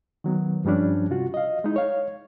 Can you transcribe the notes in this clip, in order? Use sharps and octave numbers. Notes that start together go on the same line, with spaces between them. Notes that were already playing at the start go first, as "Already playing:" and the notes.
D#3 F#3 B3
G2 F3 G3 C#4 D4
C3 F4 F#4
D#5 F5
G#3 D#4 E4
C#5 F5